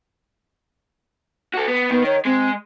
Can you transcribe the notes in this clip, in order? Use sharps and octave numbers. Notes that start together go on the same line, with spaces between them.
F#4 A4
B3
D#3 B3
C#5
G#3 C4